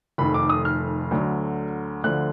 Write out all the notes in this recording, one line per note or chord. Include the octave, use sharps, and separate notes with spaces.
F1 F2 D#3 B5
D6
D#6
F6
D2 D3 F#3
D2 D3 F3 F#6